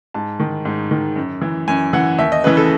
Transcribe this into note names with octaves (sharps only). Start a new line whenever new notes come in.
G#2 A5
D#3
G#2
D#3
F#2
E3
F#2 G#5
E3 F#5
D#2 E5
D#5
C#3 E3 B4
A4